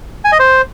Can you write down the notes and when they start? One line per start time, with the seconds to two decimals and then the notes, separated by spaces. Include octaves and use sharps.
0.25 G#5
0.32 D#5
0.40 C5